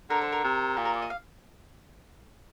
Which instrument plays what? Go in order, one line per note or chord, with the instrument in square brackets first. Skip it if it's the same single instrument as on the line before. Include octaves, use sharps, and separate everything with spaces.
[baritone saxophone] D3 [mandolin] A#4
[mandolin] C5
A#4
[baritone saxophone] C3
[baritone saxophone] A#2 [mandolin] G4
[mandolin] A#4
D5
D#5
F5